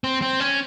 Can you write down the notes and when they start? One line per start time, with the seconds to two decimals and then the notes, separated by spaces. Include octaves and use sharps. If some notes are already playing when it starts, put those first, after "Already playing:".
0.04 C4
0.22 C4
0.40 C#4